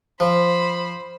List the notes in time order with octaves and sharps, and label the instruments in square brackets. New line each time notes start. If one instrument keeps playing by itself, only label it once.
[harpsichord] F3 [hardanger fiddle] C5 B5